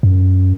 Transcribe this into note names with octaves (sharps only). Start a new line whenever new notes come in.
F#2